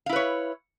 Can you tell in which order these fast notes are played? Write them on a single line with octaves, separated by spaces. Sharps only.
F5 E4 B4 C#5